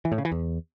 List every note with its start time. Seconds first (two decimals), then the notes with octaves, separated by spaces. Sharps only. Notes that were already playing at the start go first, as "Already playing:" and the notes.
0.05 E3
0.12 A2
0.18 C#3
0.25 E3
0.32 E2